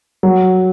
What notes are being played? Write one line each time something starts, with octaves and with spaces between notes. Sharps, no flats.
F#3